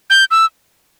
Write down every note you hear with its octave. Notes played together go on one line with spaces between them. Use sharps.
G6
E6